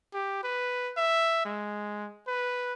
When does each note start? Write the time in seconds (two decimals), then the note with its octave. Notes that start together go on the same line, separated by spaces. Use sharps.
0.14 G4
0.44 B4
0.97 E5
1.45 G#3
2.28 B4